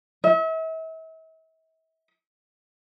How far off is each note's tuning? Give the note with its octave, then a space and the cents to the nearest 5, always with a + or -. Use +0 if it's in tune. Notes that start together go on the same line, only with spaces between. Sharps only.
E5 -40